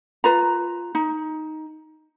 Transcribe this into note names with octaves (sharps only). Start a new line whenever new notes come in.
F4 B4 A#5
D#4